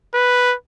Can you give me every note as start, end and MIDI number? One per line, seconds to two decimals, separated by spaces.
0.14 0.55 71